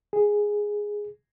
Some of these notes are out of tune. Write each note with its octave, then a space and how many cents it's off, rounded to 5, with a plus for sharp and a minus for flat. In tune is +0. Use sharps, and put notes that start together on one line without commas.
G#4 +0